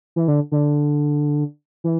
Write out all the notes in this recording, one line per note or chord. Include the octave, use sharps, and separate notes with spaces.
E3
D3
D3
E3